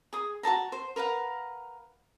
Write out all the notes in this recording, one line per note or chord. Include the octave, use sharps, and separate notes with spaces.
G#4 D#6
F#4 A#4 A5 A#5
C5
A#4 B4 F5 F#5